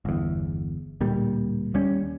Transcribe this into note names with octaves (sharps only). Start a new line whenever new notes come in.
G1 E2
D1 A#2 G3
D#2 G3 C#4